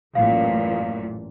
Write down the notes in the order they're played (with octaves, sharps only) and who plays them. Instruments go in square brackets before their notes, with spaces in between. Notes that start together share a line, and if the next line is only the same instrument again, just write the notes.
[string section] A1 F#2 A#2 [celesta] F5